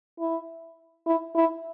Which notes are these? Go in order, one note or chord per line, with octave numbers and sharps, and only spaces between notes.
E4
E4
E4